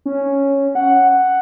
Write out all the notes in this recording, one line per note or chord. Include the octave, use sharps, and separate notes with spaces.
C#4
F#5